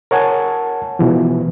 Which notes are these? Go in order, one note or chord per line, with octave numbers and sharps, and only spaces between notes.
A#4 C#5 F#5 G#5 A5
B2 E3 F3